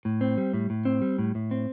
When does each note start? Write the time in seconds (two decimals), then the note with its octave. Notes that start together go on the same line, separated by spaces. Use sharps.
0.05 A2
0.21 C4
0.38 G3
0.53 A2
0.70 A2
0.85 C4
1.02 G3
1.19 A2
1.35 A2
1.51 C4